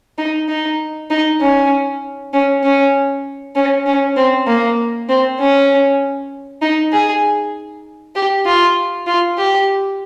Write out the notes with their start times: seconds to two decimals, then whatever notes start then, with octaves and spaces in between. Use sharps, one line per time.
0.18 D#4
0.48 D#4
1.10 D#4
1.41 C#4
2.33 C#4
2.63 C#4
3.55 C#4
3.86 C#4
4.16 C4
4.47 A#3
5.09 C4
5.39 C#4
6.62 D#4
6.92 G#4
8.15 G4
8.45 F4
9.07 F4
9.37 G4